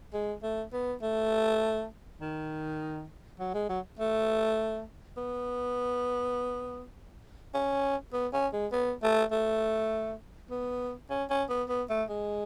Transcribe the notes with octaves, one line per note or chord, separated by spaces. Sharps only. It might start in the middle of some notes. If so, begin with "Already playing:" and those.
G#3
A3
B3
A3
D#3
F#3
G#3
F#3
A3
B3
C#4
B3
C#4
G#3
B3
A3
A3
B3
C#4
C#4
B3
B3
A3
G#3